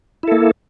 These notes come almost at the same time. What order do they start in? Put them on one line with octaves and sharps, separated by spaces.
E4 A4 A#3